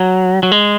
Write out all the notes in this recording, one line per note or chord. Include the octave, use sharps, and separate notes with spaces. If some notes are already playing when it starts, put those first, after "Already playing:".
Already playing: F#3
F#3
G#3